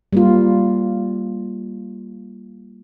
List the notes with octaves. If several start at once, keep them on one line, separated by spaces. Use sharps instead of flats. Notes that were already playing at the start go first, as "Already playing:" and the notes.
G3 A#3 F4